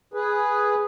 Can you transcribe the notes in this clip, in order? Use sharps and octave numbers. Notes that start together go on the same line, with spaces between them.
G#4 B4